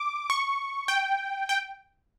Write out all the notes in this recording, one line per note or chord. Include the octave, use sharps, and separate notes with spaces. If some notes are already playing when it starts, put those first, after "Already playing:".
Already playing: D6
C#6
G5
G5